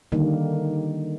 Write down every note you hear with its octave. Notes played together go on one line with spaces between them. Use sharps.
D3 D#3 G3 A#3